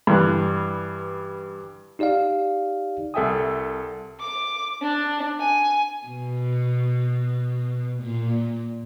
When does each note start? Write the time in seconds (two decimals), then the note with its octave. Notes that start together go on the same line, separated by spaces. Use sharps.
0.07 G2 E3 F#6
1.99 D#4 G4 D5 D#5 F5
3.14 C2 A4 E5 G5 G#5 D#6
4.19 D6
4.81 D4
5.38 G#5
6.06 B2
8.03 A#2